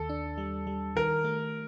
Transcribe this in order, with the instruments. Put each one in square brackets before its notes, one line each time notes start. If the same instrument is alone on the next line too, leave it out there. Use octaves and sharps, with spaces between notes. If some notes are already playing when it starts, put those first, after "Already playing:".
Already playing: [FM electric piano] D#2 [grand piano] A4
[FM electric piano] D4
G3
G3
[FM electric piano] D#3 [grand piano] A#4
[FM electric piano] A3